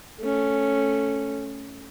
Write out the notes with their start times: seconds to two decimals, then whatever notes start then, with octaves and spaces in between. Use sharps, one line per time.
0.20 A3 C#4